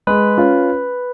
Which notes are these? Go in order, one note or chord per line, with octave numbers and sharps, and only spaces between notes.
G#3 B4
C#4 F4